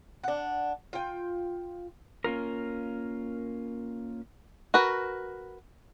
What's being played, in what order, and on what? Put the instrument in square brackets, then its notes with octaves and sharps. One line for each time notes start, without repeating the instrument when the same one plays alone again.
[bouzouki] D4 F#5
F4 G5
[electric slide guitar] A#3 C#4 F4 A#4
[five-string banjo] F#4 A#4 B4